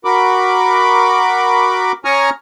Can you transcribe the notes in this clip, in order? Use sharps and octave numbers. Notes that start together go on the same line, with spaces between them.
F#4 A#4 B5 D6
C#4 G#5 A#5 C#6 D#6 F6